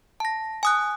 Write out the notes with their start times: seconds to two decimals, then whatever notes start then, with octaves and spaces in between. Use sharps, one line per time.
0.20 A5 A#6
0.63 G#5 D#6 F#6